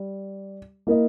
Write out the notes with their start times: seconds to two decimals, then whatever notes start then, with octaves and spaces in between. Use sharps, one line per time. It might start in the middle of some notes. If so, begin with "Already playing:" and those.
Already playing: G3
0.87 A#3 E4 A#4 D#5